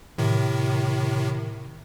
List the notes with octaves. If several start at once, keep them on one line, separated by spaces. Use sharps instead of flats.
A2 C3 D#3